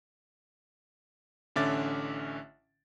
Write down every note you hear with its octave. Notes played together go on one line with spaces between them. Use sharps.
A1 D3 C#4 E5 D6 A6